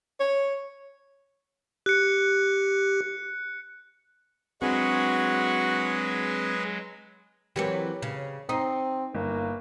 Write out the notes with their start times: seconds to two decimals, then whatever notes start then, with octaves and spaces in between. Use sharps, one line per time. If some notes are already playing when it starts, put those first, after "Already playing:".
0.20 C#5
1.86 G4 F#6 C#7
4.62 F#3 G#3 C4 D4 F#4 G#4 B4
7.56 E3 F#3 C4 G4 A#4 B4
8.02 C#3
8.49 C4 D#4 D#6 C7
9.14 G1 A#3